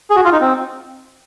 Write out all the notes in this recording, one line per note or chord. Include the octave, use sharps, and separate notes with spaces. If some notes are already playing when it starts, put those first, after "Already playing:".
G#4
F#4
F4
D#4
C4